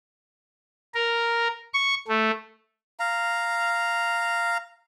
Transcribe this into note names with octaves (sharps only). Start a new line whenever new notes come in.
A#4
C#6
A3
F5 A#5